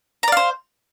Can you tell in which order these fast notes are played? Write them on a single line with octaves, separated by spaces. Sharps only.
A#5 D5 F5 C5